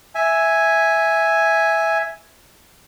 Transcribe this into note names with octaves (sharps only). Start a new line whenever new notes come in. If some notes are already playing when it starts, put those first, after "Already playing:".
E5 G#5